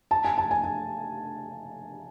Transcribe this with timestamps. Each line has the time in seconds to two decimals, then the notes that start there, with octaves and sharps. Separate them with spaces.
0.11 A5
0.25 G#5
0.38 A5
0.51 G#5
0.64 G#5